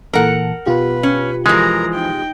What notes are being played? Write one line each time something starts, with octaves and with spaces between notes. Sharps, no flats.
A#2 E3 A4 A#4 F#5
B2 F4 G4 B4
C#4
E3 F3 G#3 A#4 A#5
D#4 G5